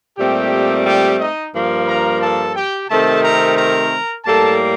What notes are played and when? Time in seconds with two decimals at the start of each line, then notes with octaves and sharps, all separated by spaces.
0.18 A#2 G3 A3 C4 G4
0.86 G3 G4
1.20 D#4 D#5
1.54 G2 F3 A#3
1.88 A#4 A#5
2.21 A4 A5
2.56 G4 G5
2.89 C3 D#3 A3 C4 A4 A5
3.24 A#4 A#5
3.57 A#4 A#5
4.25 A2 G3 A#3 A4 A5